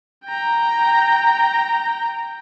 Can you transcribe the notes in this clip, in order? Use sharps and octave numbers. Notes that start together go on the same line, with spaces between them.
G5 A#5